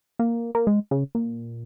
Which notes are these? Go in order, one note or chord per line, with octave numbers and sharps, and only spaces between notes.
A#3
A#3
G#3
C#3
A#2